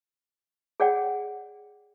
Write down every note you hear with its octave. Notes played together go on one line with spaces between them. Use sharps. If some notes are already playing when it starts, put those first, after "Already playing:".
G#4 C#5 D5 F#5 G5